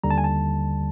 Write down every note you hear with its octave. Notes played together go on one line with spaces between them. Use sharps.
D#2 D3 G3 A#5
A5
G#5
A5